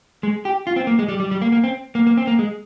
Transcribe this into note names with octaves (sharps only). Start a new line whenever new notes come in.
G#3
G4
F4
C4
A#3
G#3
G3
G3
G3
A#3
A#3
C4
A#3
A#3
C4
A#3
G#3